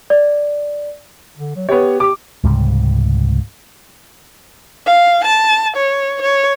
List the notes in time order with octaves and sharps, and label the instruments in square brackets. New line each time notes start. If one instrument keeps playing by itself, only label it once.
[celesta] D5
[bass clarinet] D3
F#3
[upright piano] B3 C#5 [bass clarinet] G4
[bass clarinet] G4 [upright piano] D6
[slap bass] C#2 G#2 C3 G3
[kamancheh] F5
A5
C#5
C#5